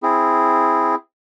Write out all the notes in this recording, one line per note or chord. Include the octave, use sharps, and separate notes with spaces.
C4 E4 G#4